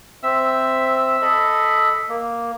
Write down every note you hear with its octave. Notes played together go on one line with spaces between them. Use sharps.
C4 E5 E6
A4 D#5 B5
A#3